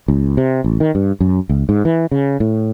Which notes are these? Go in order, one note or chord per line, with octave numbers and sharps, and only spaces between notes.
C#2
C3
A1
D#3
G2
F#2
C#2
G#2
E3
C#3
A2